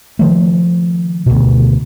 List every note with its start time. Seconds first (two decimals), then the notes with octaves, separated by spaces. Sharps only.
0.19 D#3 F3 A3
1.26 D2 B2